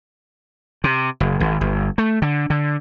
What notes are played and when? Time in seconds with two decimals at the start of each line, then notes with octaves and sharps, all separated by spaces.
0.84 C3
1.20 F#1
1.40 G#1
1.61 G1
1.98 A3
2.22 D3
2.50 D3